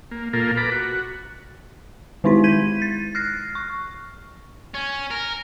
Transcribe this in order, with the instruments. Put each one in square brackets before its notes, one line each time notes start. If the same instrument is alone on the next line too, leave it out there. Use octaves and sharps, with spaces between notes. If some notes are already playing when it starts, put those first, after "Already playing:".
[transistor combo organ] A#3
A#2 A#3 F4 A4 A#4
A4 B4 A#5 B5 D6
F#4
[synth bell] D#3 G#3 D#4 E4 B6
G6 G#6 B6 D#7
A6
F6 F#6 A#6 C7
C#6
[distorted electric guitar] C#4
A#4